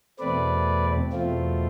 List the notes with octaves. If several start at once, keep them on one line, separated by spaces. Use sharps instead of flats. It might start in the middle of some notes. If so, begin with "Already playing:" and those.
E2 B2 A3 C4 B4 D5
E2 B2 A3 C4 F4